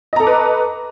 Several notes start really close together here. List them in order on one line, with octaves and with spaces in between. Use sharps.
D#5 A#5 A4 D6 B4